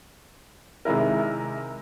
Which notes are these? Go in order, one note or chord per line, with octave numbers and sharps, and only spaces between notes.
C3 D#3 G#3 E4 A#4